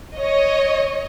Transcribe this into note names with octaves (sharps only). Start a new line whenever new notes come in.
C#5 D#5